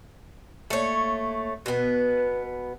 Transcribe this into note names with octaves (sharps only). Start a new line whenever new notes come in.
A3 A#3 C#5
B2 B3 B4